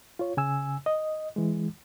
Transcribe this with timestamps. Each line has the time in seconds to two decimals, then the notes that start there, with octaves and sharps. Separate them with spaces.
0.19 F4 C#5
0.37 C#3 G#5 E6
0.86 D#5
1.36 E3 G#3